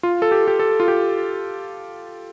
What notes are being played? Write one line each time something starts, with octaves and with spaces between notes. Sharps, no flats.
F4
A4
G4
G4
A4
F4
G4